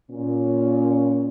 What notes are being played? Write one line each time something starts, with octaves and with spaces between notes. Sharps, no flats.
A#2 C#4